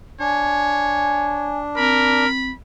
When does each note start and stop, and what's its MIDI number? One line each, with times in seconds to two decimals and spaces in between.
0.20 2.25 62
0.20 1.52 73
0.20 1.59 80
1.77 2.50 60
1.77 2.28 70
1.77 2.53 83